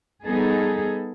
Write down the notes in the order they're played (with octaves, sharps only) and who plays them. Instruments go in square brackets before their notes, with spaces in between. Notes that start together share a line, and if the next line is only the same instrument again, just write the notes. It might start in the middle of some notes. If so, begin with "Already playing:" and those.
[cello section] G3 B3 D#4 G#4 A4